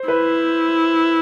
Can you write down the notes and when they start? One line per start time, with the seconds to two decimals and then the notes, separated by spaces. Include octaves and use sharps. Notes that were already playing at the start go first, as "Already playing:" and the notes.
Already playing: C5
0.08 E4 B4